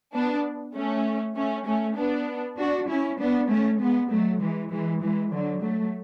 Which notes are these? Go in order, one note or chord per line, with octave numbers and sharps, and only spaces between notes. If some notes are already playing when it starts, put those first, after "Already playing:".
B3 D4
A3 C#4
A3 C#4
A3 C#4
B3 D4
D4 F#4
C#4 E4
B3 D4
A3 C#4
G#3 B3
F#3 A3
E3 G#3
E3 G#3
E3 G#3
D3 F#3
F#3 A3